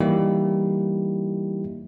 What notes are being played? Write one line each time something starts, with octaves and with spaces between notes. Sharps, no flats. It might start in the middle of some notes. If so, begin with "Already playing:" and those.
E3 G3 A#3 D#4 E4 G4